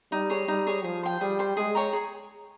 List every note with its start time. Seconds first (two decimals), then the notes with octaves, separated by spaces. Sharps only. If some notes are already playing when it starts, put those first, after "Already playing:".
0.12 G3 D#4
0.30 G#4 C#5
0.48 G3 D#4
0.67 G#4 C#5
0.84 F3 G#4
1.03 C5 G5
1.21 G3 G#4
1.39 C5 G5
1.57 G#3 G#4
1.75 C#5 G5 A#5
1.93 G#4